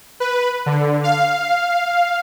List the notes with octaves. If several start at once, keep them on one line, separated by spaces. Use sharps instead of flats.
B4
D3
F5